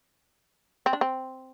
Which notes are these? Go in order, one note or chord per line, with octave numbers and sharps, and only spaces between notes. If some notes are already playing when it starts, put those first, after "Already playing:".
C4
D4
C4